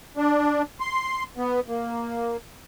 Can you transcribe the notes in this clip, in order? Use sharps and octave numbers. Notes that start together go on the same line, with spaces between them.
D4
C6
B3
A#3